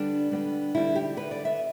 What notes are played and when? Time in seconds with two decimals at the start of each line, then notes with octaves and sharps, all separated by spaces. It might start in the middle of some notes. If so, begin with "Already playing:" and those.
Already playing: D3 G3 B3 D4
0.31 D3 G3 B3
0.74 D3 G3 B3 E4
0.95 G4
1.17 D3 B3 B4
1.31 D5
1.45 E5